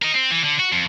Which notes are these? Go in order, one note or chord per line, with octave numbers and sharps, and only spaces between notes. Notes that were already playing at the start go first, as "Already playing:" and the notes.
A#4 D#5
C4
E3
D3
F#4
F2